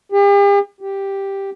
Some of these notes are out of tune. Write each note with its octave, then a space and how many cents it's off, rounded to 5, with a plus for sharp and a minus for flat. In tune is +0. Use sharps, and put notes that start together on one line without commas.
G4 +45
G4 +0